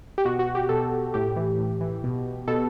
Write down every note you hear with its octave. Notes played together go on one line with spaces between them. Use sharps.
G4
B2 F#4
F#4
G4
B2 A4
A2 G4
E3
A2
E3
B2
B2 A4